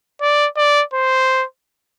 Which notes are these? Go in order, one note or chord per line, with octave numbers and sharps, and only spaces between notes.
D5
D5
C5